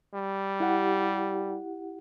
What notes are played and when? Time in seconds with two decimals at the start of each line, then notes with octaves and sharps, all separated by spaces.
0.14 G3
0.60 E4 G4 F#5